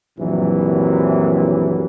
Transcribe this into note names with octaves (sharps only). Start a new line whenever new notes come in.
A#1 F#2 C3 E3 F#3